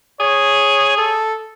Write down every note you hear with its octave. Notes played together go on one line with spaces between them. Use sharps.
G#4 C#5
A4